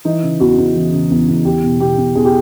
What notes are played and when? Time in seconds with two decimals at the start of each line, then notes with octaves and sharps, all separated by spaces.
0.05 E3 D#4
0.23 C#3
0.40 E2 F#4
0.58 E2
0.75 E3
0.92 C#3
1.10 E2
1.28 E2
1.45 E2 G4
1.63 B2
1.80 B2 G4
1.98 E2
2.15 E2 G#4
2.25 G4